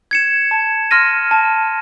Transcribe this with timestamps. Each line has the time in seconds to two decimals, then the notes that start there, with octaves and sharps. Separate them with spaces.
0.11 G#6 C#7 E7
0.51 A5
0.91 C6 F6 A#6 D#7
1.31 A5